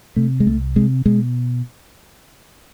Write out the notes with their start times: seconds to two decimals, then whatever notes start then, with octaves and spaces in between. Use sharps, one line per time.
0.16 C3 A3
0.40 G#3
0.46 C2 A3
0.76 C3 G#3
1.06 B2 G#3